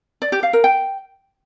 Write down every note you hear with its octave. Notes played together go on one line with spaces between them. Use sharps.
D5
G4
F5
A#4
G5